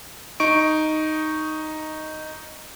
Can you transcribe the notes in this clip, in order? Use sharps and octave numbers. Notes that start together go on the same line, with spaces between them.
D#4 C#6 D7